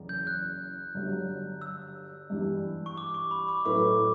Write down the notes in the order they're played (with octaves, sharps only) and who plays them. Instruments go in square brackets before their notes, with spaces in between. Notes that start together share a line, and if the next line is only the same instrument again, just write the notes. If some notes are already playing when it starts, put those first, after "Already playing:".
Already playing: [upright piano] F#1 E2 C#3 E3
[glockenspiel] G6
F#6
[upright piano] G1 G2 F#3
[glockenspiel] E6
[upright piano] G2 E3 G3
[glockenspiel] C#6
D6
C#6
B5
D6
[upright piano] A2 F#3 A3 E4 B4 [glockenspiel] D6